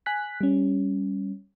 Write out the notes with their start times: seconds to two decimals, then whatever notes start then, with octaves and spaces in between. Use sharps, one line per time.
0.06 G#5 F#6 B6
0.41 G3 C#4